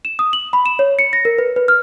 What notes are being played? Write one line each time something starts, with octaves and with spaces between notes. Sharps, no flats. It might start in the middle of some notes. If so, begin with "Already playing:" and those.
E7
D#6
F#7
B5
E7
C#5
C#7
A#6
A#4
B4
B4
F6